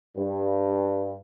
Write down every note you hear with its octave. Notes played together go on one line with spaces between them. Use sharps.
G2